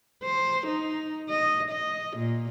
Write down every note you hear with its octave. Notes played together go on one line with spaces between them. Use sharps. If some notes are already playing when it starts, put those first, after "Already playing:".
C5
D#4
D#5
D#5
A#2